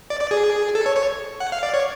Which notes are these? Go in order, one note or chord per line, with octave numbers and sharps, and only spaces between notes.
D5
D5
G#4
A4
C#5
C#5
F#5
F5
D5
C#5